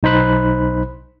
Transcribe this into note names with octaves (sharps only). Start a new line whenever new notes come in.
B1 D#4 C5 B5 F#6